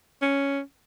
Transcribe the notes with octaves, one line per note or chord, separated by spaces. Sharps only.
C#4